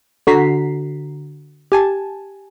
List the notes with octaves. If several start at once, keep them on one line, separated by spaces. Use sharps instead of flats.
D3 F#4 A#5 B6 C7
G4 G#5 A5